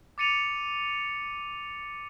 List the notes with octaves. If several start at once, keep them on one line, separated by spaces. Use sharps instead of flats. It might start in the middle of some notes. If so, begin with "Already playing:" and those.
D6 A6 C#7 D#7 F7